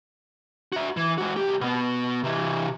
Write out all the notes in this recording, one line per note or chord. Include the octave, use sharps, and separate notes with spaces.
F#4 E5
E3
G#3 F#4
C2 G4
B2 B3
C3 E3